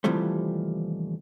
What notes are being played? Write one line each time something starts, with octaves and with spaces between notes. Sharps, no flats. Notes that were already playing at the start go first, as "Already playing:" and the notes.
D#2 C3 E3 F3 G3 A3